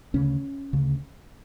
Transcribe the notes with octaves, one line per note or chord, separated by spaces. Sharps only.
D2 C#3 C#4
D2 C#3